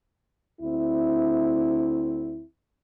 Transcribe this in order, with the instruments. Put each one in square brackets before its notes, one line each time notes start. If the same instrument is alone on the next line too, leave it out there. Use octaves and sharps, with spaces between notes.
[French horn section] D2 C4 E4